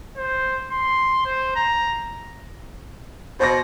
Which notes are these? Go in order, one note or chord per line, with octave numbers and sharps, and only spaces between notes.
C5
C6
C5
A#5
B2 C5 A#6